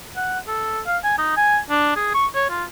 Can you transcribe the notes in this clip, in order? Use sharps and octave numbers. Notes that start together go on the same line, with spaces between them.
F#5
A4
F5
G#5
D#4
G#5
D4
G#4
C#6
C#5
F4